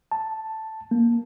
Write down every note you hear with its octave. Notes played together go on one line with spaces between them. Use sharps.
A5
A#3